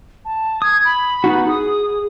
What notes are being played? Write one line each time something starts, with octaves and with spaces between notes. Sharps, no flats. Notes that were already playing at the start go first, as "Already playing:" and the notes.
A5
D#6 G#6
B5
B3 D#4 F#4
G#4 D#6